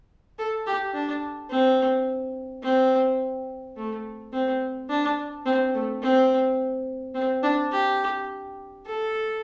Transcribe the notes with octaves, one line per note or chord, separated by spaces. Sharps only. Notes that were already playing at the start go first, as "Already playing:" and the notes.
A4
G4
D4
C4
C4
A3
C4
D4
C4
A3
C4
C4
D4
G4
A4